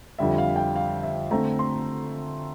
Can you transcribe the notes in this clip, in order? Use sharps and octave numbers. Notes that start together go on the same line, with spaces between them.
F2 D3 G3 E5
F5
G5
F5
E5
D3 A3 C4 A#5
C6